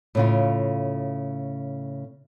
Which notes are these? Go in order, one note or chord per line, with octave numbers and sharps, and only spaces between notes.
A2 C#3 F4